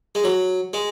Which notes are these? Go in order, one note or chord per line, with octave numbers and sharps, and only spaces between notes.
G#3
F#3
G#3